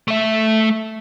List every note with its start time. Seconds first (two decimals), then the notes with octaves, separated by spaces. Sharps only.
0.08 A3 E5